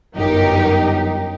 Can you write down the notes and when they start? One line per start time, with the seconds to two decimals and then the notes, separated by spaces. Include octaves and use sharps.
0.16 G1 F#2 D#4 G4 A#4